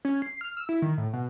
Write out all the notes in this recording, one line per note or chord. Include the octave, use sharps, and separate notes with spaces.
C#4
C7
F6
E6
E4
D#3
A2
B2